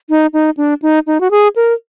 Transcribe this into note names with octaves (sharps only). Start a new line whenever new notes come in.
D#4
D#4
D4
D#4
D#4
F#4
G#4
A#4